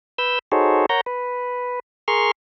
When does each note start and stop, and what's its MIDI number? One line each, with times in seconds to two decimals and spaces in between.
0.18 0.39 71
0.18 0.39 88
0.18 0.39 91
0.52 0.86 63
0.52 0.86 66
0.52 0.86 68
0.52 0.86 69
0.52 0.86 72
0.52 0.86 73
0.89 1.01 70
0.89 1.01 73
0.89 1.01 78
0.89 1.01 82
0.89 1.01 91
1.06 1.80 71
2.08 2.31 68
2.08 2.31 70
2.08 2.31 84
2.08 2.31 85
2.08 2.31 89